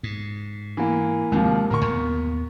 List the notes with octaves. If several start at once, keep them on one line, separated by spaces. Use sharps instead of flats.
G#2
E3 A#3
D#2 C3 F3 G#3 A#3
D1 A2 D3 A#4 C#6
D#2 B3